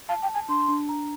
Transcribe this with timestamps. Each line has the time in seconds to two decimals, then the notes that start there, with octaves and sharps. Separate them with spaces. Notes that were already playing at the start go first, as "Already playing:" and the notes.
0.09 F5 A5
0.22 G5
0.29 A5
0.34 G#5
0.49 D4 C6
0.68 D4
0.89 A#5